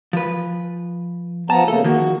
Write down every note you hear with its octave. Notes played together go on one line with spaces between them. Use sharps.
F3 B4
F3 B3 A5 A#5
C#3 A3 A#3 A4
D#3 F3 A#3 F#4